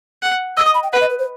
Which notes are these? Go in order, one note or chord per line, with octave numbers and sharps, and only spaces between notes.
F#5
D#5 E6
D#6
B5
G5
B4 F#5
D#5
B4
C5